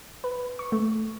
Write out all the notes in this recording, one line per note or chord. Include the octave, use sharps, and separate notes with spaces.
B4
C#6
A3